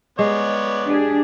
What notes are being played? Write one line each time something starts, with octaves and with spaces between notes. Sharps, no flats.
G#3 B3 C#5 D5
D4 G4 G#4